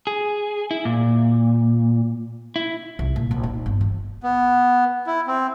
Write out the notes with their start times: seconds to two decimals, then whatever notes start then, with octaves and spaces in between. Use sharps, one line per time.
0.07 G#4
0.71 E4
0.85 A#2
2.56 E4
2.99 C2
3.16 A#2
3.31 A#1
3.43 D#4
3.66 G1
3.81 E3
4.23 B3
5.07 E4
5.27 C4